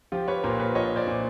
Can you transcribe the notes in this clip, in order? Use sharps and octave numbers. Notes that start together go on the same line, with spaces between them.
F3 F4 G4
B4 C#5
A#2 A#4 C5
B4 C#5
F3 C#5 D#5
C5 D5
A#2